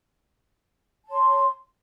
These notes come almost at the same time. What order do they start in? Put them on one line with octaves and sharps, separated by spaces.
A5 C#5 C6